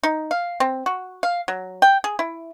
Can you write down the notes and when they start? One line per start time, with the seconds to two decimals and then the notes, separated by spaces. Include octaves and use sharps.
0.03 D#4
0.31 F5
0.60 C4
0.86 F#4
1.23 F5
1.48 F#3
1.82 G5
2.04 G#4
2.19 E4